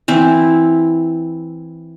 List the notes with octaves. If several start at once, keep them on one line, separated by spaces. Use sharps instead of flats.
E3 C4 E4